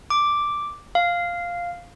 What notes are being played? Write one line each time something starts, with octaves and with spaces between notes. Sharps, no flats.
D6
F5